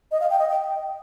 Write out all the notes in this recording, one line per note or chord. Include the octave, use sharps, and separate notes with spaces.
D#5
F5
G5
D#5
G5